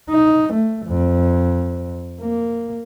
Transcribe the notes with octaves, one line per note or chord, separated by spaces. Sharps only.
D#4
A3
F2
A#3